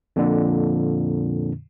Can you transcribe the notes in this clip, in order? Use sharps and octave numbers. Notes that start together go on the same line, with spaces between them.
F2 A#2 D3